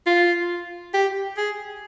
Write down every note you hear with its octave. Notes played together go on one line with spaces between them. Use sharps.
F4
G4
G#4